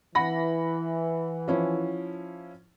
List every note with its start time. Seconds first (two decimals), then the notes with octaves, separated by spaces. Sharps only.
0.15 E3 F#5 B5 A#6
1.48 F3 C#4 E4